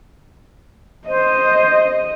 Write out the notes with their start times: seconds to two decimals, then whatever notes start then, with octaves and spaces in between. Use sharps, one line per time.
1.08 C5 D#5